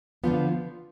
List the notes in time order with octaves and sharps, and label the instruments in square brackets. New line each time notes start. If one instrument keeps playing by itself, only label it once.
[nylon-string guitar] D3 F3 B3 F4